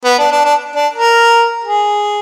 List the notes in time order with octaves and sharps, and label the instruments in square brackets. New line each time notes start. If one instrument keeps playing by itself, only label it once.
[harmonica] B3
D4
D4
D4
D4
A#4
G#4